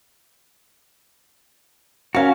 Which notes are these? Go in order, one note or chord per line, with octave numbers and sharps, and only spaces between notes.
C#4 F#4 A#4 F5